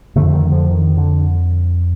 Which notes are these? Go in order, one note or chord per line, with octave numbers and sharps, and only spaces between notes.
F2 D3 F3 A3
D#3
D3 F3
D#3
D3